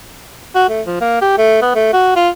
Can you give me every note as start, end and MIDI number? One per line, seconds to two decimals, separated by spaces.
0.55 0.65 66
0.69 0.82 57
0.86 0.97 53
1.01 1.20 58
1.22 1.36 67
1.38 1.57 57
1.62 1.71 59
1.75 1.90 57
1.93 2.15 66
2.16 2.29 65